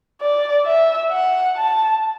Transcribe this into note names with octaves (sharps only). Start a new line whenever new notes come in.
D5
E5
F#5
A5